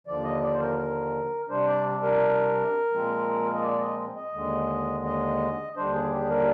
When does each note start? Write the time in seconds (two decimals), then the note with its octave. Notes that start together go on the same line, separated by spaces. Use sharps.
0.07 D#2 D3 F3 D5
0.24 D#5
0.42 D5
0.53 C5
0.60 A#4
0.78 A#4
1.49 C3 G3 D4 C5
1.67 D5
2.03 A#4
2.92 A#2 F3 G#3 C4
3.54 D#5
3.62 D5
3.80 D#5
4.16 D#5
4.33 D#2 D3 G#3
5.05 D#5
5.76 D#2 D3 G3 D4 C5
5.94 G#4
6.12 G4
6.21 G#4
6.29 A#4